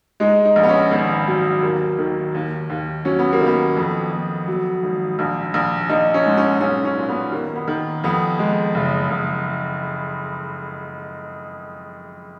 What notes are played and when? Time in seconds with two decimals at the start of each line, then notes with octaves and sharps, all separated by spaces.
0.20 G#3 D#4
0.45 D#4
0.56 A#1
0.63 B3
0.69 C#4
0.91 G#1 B3
1.28 F#3
1.63 D#2 A#3
1.98 D#3
2.35 D#2
2.70 D#2
3.05 F#3 C#4
3.19 B3
3.33 A#3
3.41 D#3
3.47 B3
3.76 F2
4.12 F2
4.48 F#3
4.83 G#1
5.19 A#1
5.54 A#1
5.89 A#1 D#4
6.14 C#4
6.26 G#2
6.37 C#4
6.61 B1 C#4
6.85 C#4
6.97 A#2
7.09 B3
7.32 D#3 A#3
7.55 B3
7.68 D#3
8.04 F2 B3
8.39 G#3
8.74 F#1
9.10 F#1